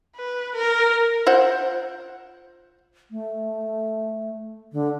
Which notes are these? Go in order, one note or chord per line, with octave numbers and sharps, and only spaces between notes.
B4
A#4
F4 C5 F#5
A3
D3